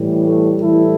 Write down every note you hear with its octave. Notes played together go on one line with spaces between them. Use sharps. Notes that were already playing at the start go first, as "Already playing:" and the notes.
Already playing: A2 E3 G3
A3
A2 E3 G3 E4 A4